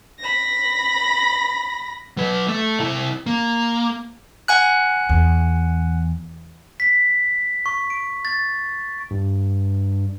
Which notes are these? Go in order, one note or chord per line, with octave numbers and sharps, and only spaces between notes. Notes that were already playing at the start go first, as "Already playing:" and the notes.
B5 A#6
F#3 B4
A3
C3 E4
A#3
F#5 G#5 F#6
E2
B6
C#6
D7
A6
G2